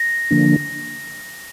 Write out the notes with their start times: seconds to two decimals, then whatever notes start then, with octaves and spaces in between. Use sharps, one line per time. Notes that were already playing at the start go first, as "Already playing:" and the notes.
Already playing: A#6
0.31 D3 F3 A#3 D4